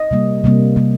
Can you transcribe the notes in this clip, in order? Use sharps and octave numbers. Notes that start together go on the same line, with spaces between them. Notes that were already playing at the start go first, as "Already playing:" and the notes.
Already playing: D#5
C3 G3 A#3
C3 G3 A#3
C3 G3 A#3